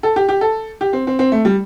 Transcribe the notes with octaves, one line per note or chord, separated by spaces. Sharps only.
A4
G4
G4
A4
G4
C4
C4
C4
A3
G3